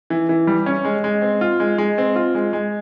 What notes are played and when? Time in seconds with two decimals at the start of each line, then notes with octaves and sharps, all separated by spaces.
0.10 E3
0.29 E3
0.47 G3
0.66 C#4
0.85 G#3
1.04 G#3
1.22 C4
1.41 F4
1.60 G#3
1.78 G#3
1.98 C4
2.16 F4
2.35 G#3
2.53 G#3